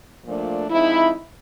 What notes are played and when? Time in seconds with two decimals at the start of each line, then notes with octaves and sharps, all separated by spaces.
0.24 A#2 F3 A3 D4
0.68 F3 G#3 C4 D#4 E4